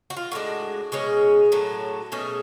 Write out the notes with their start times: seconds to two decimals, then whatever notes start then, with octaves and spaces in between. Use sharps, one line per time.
0.10 F#4
0.17 F4
0.32 A2 G#3 D4 F#4
0.92 B2 G#3 C#4 G#4
1.52 A2 F#3 A3 D4
2.12 B2 A3 C#4 G#4